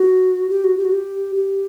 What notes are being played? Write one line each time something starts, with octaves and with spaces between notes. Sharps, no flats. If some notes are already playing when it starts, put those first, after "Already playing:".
Already playing: F#4
G4
F#4
G4
F#4
G4
G4